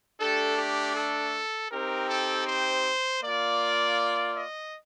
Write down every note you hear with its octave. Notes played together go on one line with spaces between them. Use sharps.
A3 D4 G4 A4
G4
A4
C4 D#4 G4 A#4
A4
C5
A#3 F4 D5
D#5